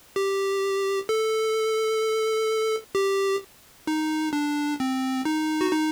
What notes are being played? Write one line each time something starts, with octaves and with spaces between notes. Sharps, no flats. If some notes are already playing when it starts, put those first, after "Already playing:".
G4
A4
G4
D#4
D4
C4
D#4
F#4
D#4